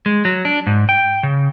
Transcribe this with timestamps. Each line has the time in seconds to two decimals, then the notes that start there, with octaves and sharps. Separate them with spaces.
0.06 G#3
0.25 F#3
0.45 D4
0.67 G#2
0.89 G5
1.23 C#3